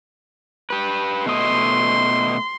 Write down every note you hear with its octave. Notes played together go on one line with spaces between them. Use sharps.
G4 B4
B2 A3 D#5 C6